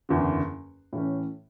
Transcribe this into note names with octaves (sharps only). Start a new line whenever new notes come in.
F#1 E2 D3
A2 E3 A3 C#4